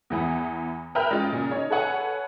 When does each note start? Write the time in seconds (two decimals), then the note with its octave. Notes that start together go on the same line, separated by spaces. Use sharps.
0.10 E2 E3 B3 B5
0.95 A#4 B4 E5 G5 F6
1.11 G#3 C#4 F4
1.33 A#2 C#3
1.51 D#4 C#5
1.70 A4 B4 C#5 F#5 G#5